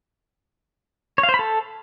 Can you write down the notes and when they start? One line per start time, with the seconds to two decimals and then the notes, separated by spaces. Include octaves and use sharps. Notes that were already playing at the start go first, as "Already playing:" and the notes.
1.18 C#5
1.23 F5
1.29 C5
1.34 B5
1.39 A4